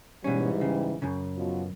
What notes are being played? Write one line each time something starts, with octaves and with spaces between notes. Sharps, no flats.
G#2 B2 E3 G3 C#4
C#3
F#2 C#3
B2 F3 F#3